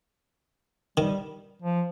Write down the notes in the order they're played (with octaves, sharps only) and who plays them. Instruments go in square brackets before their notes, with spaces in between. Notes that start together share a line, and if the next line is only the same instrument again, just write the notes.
[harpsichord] D#3 [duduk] G3
[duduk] F3